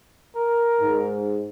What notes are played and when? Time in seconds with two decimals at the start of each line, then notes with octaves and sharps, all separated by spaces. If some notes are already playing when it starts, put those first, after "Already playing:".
0.35 A#4
0.81 G#2